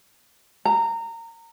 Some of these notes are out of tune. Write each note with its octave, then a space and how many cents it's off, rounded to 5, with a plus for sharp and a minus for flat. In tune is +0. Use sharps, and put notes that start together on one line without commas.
A#5 -20